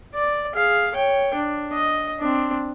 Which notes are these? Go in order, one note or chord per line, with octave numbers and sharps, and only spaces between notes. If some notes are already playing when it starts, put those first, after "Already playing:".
D5
G#4 F5
C#5 G5
D4
D#5
C4 D4